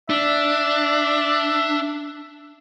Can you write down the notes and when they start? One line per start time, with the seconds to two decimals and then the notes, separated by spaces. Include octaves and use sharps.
0.10 D4 E5